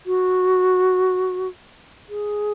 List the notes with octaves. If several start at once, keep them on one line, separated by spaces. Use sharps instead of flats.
F#4
G#4